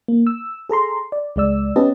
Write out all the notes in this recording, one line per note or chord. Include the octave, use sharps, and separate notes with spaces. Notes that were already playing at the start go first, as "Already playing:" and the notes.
A#3
E6
G#4 A4 A#5 C6
D5
C#2 G#3 D5 E6
B3 C#4 G4 B4 D#5 A5